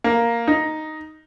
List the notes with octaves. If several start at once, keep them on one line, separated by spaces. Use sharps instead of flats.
A#3
D#4